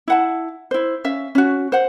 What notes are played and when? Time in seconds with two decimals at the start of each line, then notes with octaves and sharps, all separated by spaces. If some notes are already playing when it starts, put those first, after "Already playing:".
0.08 E4 F#5 A5
0.71 E4 C5
1.04 C#4 E5 F5
1.35 C#4 F#4
1.72 C5 F#5